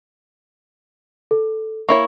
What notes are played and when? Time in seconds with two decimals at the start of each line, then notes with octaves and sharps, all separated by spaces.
1.31 A4
1.89 A#3 E4 C#5 C#6